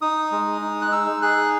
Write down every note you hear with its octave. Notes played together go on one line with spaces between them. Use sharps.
D#4 D#6
G#3
D#4
F#6
D#4 E6
G#4 F#6